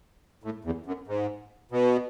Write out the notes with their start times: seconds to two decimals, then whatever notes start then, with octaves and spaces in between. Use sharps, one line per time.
0.44 A2
0.65 E2
0.86 F#2
1.07 G#2
1.71 B2